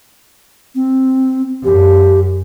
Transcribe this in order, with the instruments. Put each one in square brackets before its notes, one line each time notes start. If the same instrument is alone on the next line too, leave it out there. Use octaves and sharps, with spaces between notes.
[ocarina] C4
[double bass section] F#2 [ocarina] G4